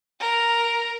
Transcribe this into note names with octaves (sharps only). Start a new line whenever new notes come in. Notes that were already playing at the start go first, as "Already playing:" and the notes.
A#4